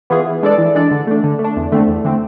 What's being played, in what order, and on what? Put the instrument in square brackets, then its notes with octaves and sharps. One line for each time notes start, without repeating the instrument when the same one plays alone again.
[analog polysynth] E3 B3 F4 G#4
E3
G#3 D4 A4 D5
E3
G#3 D4 A4 D5
D3
A3 D4
D3
A3
D4
E2
D3 A3 C4
E2
D3 A3 C4